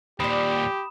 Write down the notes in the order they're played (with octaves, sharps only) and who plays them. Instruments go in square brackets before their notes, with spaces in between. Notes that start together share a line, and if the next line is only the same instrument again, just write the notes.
[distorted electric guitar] D#2 A#2 [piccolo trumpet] G4 [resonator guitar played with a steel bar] C5 D5 [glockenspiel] B5 D#6 E7